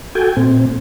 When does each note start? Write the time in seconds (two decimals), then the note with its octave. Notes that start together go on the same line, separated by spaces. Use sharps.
0.15 F#4 A4 G5 G#5
0.36 A#2 C4